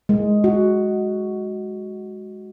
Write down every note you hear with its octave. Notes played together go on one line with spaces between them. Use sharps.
G#3
F#4